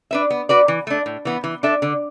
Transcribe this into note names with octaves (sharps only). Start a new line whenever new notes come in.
D4 B4 E5
B3
F#4 B4 D5
E3
A3 D4
A2
E3 B3
E3
D4 A4 E5
D3